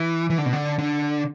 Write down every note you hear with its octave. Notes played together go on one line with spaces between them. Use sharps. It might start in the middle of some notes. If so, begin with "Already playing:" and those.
Already playing: E3
E3
D3
B2
D3
D3